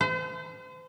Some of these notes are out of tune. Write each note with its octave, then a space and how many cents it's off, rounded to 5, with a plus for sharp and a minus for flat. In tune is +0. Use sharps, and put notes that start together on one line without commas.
C5 -40